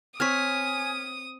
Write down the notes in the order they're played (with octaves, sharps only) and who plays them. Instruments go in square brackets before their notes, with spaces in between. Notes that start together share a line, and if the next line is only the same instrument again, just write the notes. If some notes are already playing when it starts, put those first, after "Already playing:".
[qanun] C4 C#5 [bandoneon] G#5 [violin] D#6 [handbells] F6 G#6 B6